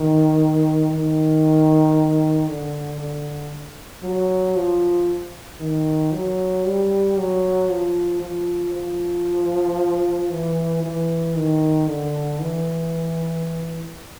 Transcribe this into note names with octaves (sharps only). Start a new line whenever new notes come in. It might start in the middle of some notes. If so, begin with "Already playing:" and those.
Already playing: D#3
D#3
D3
D3
F#3
F3
D#3
F#3
G3
F#3
F3
F3
F3
E3
E3
D#3
D3
E3